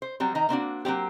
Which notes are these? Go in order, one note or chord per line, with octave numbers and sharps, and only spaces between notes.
C5
F#3 G3 C4
D#3 D#4 A#5
A#3 C4 D4 F#4
F#3 A#3 C4 G4